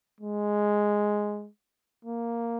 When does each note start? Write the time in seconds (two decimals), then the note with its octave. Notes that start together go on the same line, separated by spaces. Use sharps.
0.21 G#3
2.05 A#3